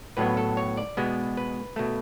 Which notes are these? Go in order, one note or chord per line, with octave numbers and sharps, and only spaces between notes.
A2 F#3 B3 B4
A4
C#5
D5
B2 G#3 B3
B4
B2 A3